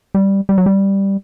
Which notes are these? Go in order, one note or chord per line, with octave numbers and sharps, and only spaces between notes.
G3
G3
F#3
G3